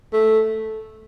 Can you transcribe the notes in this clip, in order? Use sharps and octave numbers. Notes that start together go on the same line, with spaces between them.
A3